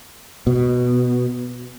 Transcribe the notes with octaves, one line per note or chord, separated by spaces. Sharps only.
B2